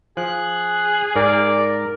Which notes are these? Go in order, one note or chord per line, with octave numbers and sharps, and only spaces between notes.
F3 G#4 F#6
G#2 A#4 D5